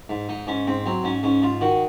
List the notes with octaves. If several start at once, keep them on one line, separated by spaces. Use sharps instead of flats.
G#2
G#2 D#4
G#2 C#4
G#2 C4
F#3 C4
G#2 C#4
G#2 C#4
G#2 F4
D#3 F#4